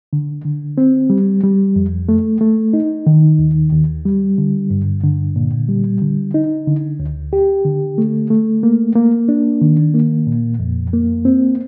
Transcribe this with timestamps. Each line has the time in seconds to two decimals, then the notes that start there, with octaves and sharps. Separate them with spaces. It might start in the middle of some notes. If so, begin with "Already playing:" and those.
0.13 D3
0.44 D3
0.78 C4
1.10 G3
1.44 G3
1.76 F2
2.09 A3
2.41 A3
2.73 D#4
3.07 D#3
3.39 D#2
3.73 D#2
4.05 G3
4.38 D3
4.70 G2
5.03 D3
5.36 A#2
5.69 G3
6.02 D3
6.34 D#4
6.67 D3
7.00 D2
7.33 G4
7.65 D3
7.98 A3
8.30 A3
8.63 A#3
8.96 A#3
9.29 D4
9.61 D#3
9.94 A#3
10.27 A#2
10.59 F2
10.93 A#3
11.25 C4